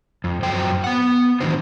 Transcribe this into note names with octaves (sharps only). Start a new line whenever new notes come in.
F2
F#2 F#3 C5 G5
B3 F#5
A2 D#3 E3 F#3 D4 C5